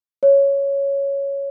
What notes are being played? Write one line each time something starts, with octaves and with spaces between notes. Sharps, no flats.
C#5